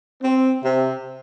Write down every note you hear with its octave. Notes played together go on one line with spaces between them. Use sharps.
C4
C3